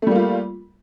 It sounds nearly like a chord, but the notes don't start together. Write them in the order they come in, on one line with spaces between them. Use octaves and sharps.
A3 G3 A#3 F4